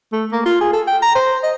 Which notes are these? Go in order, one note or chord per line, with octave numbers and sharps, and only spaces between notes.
A3
A#3
F4
G#4
A4
G5
A#5
C5
D#5